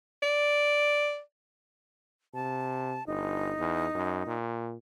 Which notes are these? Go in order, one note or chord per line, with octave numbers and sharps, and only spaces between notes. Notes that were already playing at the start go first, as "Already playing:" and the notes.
D5
C3 A5
G1 D#4
E2
F#2
A#2